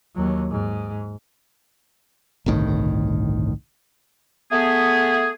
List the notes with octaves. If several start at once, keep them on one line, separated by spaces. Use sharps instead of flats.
D#2 F#3
G#2
G1 C2 A2 D#3
A3 B3 G#4